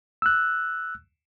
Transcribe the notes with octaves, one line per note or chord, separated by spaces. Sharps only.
E6 F#6